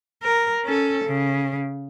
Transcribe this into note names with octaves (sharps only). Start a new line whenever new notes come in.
A#4
C#4 A4
C#3